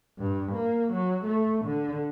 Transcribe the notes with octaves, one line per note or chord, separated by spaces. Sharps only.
G2
A#3
F#3
A3
D3